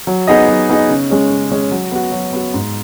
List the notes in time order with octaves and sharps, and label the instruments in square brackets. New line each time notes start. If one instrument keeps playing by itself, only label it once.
[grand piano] F#3
B3 D#4 G#4 D#5
F#3
B3 D#4 G#4 D#5
C#3
G#3 C#4 G#4
C#3
G#3 C#4 G#4
F#3
B3 F#4
F#3
B3 F#4
G#2